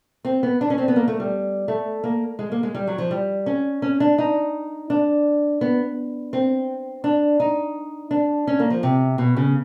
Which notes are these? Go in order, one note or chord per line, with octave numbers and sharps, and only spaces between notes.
C4
B3
D4
C#4
C4
B3
A#3
A3
G3
A3
A#3
G#3
A#3
G#3
G3
F#3
F3
G3
C#4
C#4
D4
D#4
D4
B3
C4
D4
D#4
D4
C#4
A#3
F3
C3
B2
C#3